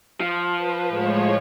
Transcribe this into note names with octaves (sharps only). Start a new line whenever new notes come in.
F3
B4
A2 G#3 C#5